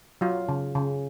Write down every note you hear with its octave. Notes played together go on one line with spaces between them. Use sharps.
F#3 F4
C#3
C#3